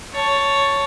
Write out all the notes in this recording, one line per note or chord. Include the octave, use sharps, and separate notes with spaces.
C#5 A5